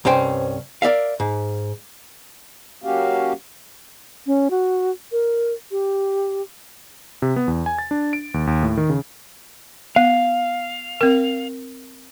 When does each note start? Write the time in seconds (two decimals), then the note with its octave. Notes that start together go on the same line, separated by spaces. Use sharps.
0.05 C2 G2 C#4 C5 G5
0.82 A#4 D5 E5 F5
1.20 G#2
2.84 F#3 A#3 C#4 F#4 G4 F5
4.27 C#4
4.50 F#4
5.12 A#4
5.71 G4
7.22 C3
7.36 B3
7.48 E2
7.66 G#5
7.78 A6
7.91 D4
8.13 D7
8.34 D#2
8.47 D#2
8.63 A2
8.77 D#3
8.90 C#3
9.96 B3 F5
11.01 C4 A#4